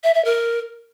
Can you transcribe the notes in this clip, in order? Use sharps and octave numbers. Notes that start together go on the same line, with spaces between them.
E5
E5
A#4